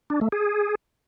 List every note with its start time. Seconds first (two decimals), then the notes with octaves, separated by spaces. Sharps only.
0.10 D4
0.21 A3
0.32 G#4